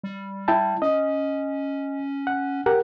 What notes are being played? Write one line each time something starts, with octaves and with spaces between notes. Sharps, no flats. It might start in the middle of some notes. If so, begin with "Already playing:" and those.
G3
E4 G5 A5
C#4 D#5
F#5
G4 A#4 F#5